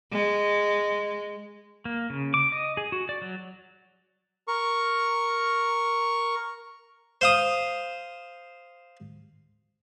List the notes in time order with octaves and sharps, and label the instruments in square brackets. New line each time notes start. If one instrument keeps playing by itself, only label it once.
[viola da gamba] G#3
[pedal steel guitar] A#3
C#3
D6
D#5
G#4
F#4
D5
F#3
[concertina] A#4 C#6
[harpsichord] C5 F5 D#6